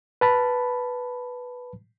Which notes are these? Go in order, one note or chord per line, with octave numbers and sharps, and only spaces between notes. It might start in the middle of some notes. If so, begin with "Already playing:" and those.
B4 A5 B5